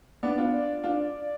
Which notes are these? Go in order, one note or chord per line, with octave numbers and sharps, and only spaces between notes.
B3 D4 D5
D4 F4
D5
D4 F4